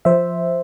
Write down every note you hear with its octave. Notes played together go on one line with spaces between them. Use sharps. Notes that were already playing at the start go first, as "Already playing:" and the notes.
F3 C5 E5